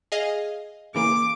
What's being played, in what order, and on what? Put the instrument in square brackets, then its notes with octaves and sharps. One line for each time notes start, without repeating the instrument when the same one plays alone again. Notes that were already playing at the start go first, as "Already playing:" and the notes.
[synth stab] G#4 D#5 F5
[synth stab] C#3 E3 A#3 [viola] D6